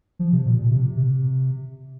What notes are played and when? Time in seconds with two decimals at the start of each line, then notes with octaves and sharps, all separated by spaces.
0.19 F3
0.32 C3
0.46 A#2
0.58 A#2
0.71 C3
0.97 C3